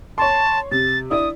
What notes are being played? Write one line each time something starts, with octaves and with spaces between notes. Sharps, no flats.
C#5 A5 C6
C3 A6
D4 E4 D5 D#6